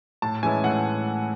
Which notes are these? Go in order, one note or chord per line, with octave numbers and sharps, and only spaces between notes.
A2 A5
E3 G#3 C#4 E4 G#5
A2 F#5